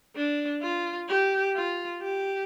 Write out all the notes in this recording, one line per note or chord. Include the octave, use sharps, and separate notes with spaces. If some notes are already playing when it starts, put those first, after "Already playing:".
D4
F4
G4
F4
G4